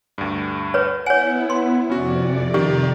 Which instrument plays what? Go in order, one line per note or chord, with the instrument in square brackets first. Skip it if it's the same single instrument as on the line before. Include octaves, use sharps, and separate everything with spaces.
[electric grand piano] D2 G2
[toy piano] B4 C#5
[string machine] B3 E4 [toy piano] C#5 G#5 [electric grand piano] F#5
[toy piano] C6
[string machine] F2 C3 D5 [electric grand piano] C#4 F#4
[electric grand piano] D#3 [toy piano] G4